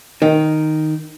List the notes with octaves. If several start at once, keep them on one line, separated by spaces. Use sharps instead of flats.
D#3